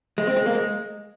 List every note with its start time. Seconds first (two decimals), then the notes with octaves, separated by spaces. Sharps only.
0.18 G#3
0.27 C4
0.36 G#3
0.46 A#3
0.55 G#3